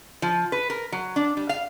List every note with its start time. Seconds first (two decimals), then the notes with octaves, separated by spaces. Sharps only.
0.22 F3
0.52 B4
0.70 A#4
0.92 F#3
1.16 D4
1.37 G3
1.49 F5